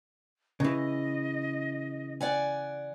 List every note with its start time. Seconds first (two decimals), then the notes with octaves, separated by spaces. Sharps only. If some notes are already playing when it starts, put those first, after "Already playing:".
0.60 C#3 E3 D#5
2.21 D5 F#5 G#5